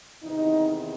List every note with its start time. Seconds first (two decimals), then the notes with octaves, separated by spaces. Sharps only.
0.23 E2 C3 D#3 D#4